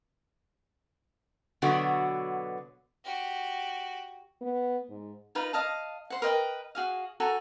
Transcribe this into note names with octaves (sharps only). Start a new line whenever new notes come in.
B2 D3 F#3 B3 F#4
F#4 G4
B3
G#2
D#4 F4 B4 A#5
D#5 F5 A5
C5 F#5
A#4 B4 D#5 G5
F#4 G#4 F5
F#4 A4 G#5 A#5